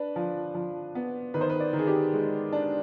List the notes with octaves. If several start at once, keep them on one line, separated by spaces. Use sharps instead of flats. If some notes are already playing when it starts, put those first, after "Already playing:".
Already playing: D4 B4
F3
F3
B3
D#3 B4
C5
B4
D5
D#3
G#4
G4
G#3
D4